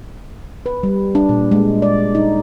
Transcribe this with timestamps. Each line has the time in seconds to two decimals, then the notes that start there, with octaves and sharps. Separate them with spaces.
0.66 B4
0.83 G3
1.15 D4
1.29 A#2
1.51 G#3
1.82 D5
2.15 D#4